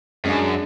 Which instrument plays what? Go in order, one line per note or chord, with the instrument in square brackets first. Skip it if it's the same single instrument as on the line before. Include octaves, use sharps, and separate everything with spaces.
[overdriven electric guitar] F#2 [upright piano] G#3 D4 G#4